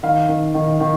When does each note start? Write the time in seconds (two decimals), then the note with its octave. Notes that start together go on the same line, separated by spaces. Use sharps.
0.03 D#3 F5
0.29 D#3
0.54 D#3
0.80 D#3